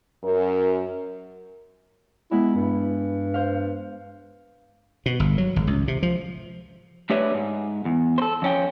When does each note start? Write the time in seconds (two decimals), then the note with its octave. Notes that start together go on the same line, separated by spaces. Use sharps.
0.24 F#2 A#4
2.31 G#3 B3 E4
2.55 G2
3.34 C5 F5
5.06 B2
5.20 G1
5.38 F#3
5.56 G#1
5.67 C#2
5.88 C3
6.03 F3
7.10 A3 D4 G4 B4 C#5 E5
7.34 G#2
7.85 E2
8.18 A4 C5
8.42 F2 C#4 G5